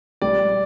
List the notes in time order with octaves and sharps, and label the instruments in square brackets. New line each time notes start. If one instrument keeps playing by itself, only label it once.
[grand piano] G3 D5